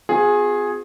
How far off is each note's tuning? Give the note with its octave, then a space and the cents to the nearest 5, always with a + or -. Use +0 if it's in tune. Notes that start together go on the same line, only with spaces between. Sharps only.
C4 -20 F4 +45 G#4 +0